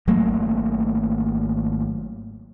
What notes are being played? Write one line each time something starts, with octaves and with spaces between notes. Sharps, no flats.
G#1 F#3 A3 A#3